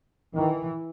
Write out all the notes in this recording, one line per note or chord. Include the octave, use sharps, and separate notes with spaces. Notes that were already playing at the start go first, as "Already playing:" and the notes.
D#3 E3